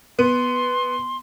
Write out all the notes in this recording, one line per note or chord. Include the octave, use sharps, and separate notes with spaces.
B3 C6